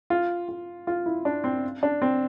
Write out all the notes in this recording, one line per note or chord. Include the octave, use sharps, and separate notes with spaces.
F4
F4
F4
E4
D4
C4
D4
C4